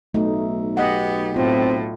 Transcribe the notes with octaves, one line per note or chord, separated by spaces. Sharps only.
B1 A3 D#4
B3 G4 D#5 F#5
A2 C4 F4